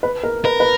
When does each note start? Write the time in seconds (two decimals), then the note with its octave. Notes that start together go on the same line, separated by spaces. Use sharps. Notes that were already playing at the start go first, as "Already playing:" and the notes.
0.03 B4
0.23 A#4
0.45 A#4 B4
0.60 B4